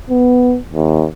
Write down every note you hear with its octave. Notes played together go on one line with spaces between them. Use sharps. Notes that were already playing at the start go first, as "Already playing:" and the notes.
B3
D#2